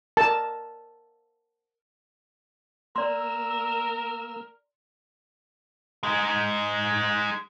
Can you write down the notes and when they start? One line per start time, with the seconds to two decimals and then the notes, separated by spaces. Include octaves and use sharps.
0.17 A#4 A5
2.96 A#3 A#4 D5 C6 E6
6.03 G#3 D#4